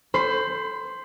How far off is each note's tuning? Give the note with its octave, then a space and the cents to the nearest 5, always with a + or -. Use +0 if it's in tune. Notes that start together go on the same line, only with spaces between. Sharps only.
C5 +0 B5 +30